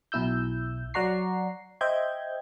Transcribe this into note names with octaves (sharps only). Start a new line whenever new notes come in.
B1 B2 E4 E6 G6
F#3 D5 F#5 A#5 C#6 C7
C5 D#5 E5 G5 G6 G#6